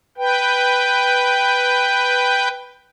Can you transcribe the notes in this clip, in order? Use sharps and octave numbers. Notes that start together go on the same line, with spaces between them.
B4 G5